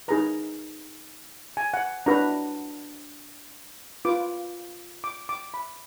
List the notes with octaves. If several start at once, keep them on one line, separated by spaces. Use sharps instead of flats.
D#4 G#4 B4 A#5
G#5
F#5
D4 F#4 B4 A#5
F4 B4 D6
D6
D6
B5